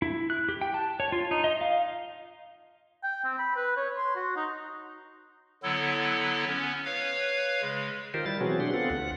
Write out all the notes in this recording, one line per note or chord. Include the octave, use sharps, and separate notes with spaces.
E4
F#6
G4
G5
A5
C#5
F4
D#4
D#5
F5
G5
C4
B5
B4
C#5
C6
F#4
D#4
D3 F#3 B3 E4 A4
B3 C#4
B4 C#5 F5
C#3 G#3
D#3 F4 G4 A#4 C5
G3 E4 A6
B2 E3 F#3 C4 F#4 G#4
D4 G4 F#5 C6
B3 C4 F4 A4 F#5
D2 F#5